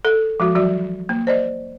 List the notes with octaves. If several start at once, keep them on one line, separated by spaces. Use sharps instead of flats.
A4
F3 G#3 F#4
E3 F#3 F#4 D5
A#3
C5 D5 D#5